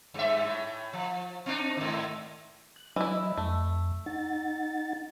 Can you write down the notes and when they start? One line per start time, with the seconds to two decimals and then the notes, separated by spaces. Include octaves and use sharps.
0.14 G2 E5
0.44 A2
0.93 F3
1.46 C4 D4 D#4
1.77 G#2 D#3
2.76 F#6
2.96 E3 F#3 E4 D#5
3.37 F2 A3
4.06 D#4 F#5 A6